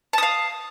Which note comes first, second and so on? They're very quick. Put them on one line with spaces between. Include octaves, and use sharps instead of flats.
A5 D#6 F5